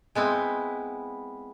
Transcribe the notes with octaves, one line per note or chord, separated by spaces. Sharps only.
G#3 B3 C4 E4